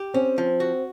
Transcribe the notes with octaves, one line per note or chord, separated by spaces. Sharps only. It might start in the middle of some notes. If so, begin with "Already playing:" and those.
Already playing: G4
C4 C#4
F3
F#4